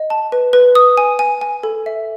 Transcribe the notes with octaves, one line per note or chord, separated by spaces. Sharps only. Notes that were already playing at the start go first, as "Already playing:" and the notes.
Already playing: D#5
A5
B4
B4
D#6
G#5
G#5
G#5
A4
E5